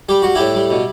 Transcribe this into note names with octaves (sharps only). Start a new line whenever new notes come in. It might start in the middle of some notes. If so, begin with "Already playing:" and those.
G3 G4
G3 F#4
A2 E4 G4
G3
B2